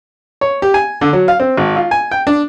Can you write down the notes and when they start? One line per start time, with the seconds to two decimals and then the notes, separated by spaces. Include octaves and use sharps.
0.41 C#5
0.62 G4
0.74 G#5
1.01 D3
1.13 F#3
1.28 F5
1.40 C4
1.57 G#1
1.76 F4
1.91 G#5
2.11 G5
2.27 D4